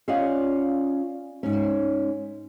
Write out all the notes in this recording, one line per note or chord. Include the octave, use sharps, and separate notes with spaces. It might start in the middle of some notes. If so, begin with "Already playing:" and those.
C#4 F4 D5 D#5 F5 F#5
G#2 C#4